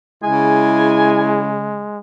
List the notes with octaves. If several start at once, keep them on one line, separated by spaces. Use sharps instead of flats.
C#3 G#3 E4 G#5